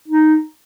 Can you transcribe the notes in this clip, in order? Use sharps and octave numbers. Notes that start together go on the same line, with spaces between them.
D#4